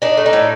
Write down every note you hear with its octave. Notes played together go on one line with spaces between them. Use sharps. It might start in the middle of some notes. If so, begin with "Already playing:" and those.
D4 D#4
A3
D#4
A2